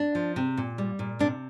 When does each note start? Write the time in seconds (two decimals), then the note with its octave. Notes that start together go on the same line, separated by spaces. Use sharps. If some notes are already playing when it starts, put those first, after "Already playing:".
Already playing: D4
0.15 F3
0.36 C3
0.57 A#2
0.78 G3
0.99 A#2
1.19 C3 D4